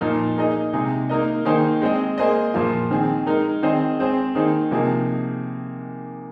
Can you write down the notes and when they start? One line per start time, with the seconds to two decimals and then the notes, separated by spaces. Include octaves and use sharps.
0.01 A#2 F3 A#3 D#4
0.37 A#3 D#4 G#4 D#5
0.73 C3 G#3 D#4 G#4
1.09 A#3 D#4 A#4 D#5
1.45 D#3 A#3 D#4 G#4 C5
1.82 G#3 C4 G#4 D#5
2.18 A#3 G#4 C5 D#5
2.54 A#2 F3 A#3 F4
2.90 D#3 C4 G#4
3.26 G#3 D#4 A#4
3.62 D#3 C4 G#4 C5 D#5
3.99 G#3 C4 G#4 C5
4.35 D#3 A#3 D#4 G#4 C5
4.71 C3 F3 A#3 D#4 G#4